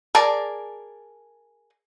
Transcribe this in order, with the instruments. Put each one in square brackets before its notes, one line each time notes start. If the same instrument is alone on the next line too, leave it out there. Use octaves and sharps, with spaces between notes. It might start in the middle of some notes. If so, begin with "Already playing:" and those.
[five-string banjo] G#4 A#4 D5 A5